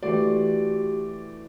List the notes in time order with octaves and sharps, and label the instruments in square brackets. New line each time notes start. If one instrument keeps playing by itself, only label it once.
[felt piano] E3 A3 D5 [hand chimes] F#4 G4